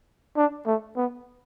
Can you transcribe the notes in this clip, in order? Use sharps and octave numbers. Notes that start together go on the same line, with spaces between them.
D4
A3
B3